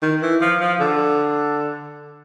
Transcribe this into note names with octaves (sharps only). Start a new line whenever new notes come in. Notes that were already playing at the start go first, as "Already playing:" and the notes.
D#3
E3
F3
F3
D3